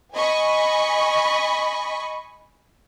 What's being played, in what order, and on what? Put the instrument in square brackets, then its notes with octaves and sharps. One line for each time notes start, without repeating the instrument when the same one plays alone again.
[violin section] D#5 G#5 B5 C#6